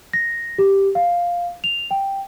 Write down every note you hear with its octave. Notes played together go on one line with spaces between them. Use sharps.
A#6
G4
F5
F7
G5